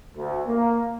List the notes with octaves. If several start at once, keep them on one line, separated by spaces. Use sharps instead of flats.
D2
A#3